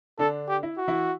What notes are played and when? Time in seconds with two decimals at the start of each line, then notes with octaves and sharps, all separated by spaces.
0.19 D3 D4 A4
0.48 G4
0.63 E4
0.78 F#4
0.88 E3 E4